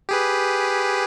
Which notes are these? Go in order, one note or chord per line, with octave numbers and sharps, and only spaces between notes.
G4 G#4 B4